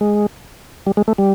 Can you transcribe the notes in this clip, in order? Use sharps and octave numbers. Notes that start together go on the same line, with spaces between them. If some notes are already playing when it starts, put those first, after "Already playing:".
G#3
G3
G#3
A3
G3